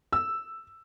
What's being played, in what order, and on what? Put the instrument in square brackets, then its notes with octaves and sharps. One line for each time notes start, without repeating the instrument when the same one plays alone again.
[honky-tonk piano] E6